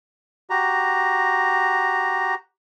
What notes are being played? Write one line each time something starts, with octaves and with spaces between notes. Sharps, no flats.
F#4 G4 A#5